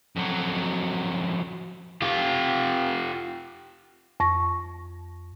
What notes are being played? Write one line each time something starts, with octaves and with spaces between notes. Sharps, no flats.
F2 F#3
F4 G4
F2 C#6 A#6